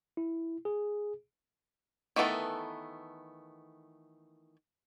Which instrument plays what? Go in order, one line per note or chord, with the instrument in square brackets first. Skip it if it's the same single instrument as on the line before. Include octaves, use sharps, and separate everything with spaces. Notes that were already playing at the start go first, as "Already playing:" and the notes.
[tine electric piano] E4
G#4
[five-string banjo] D#3 E3 A3 B3 A4